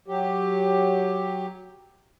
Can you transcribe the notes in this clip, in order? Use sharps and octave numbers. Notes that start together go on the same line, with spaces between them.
F#3 G4